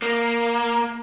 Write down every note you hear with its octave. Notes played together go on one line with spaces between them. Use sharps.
A#3